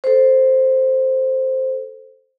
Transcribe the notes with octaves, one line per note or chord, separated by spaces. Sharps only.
A4 C5